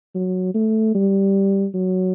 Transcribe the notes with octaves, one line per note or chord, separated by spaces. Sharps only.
F#3
A3
G3
F#3